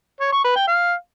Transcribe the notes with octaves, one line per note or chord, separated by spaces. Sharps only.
C#5
C#6
B4
G5
F5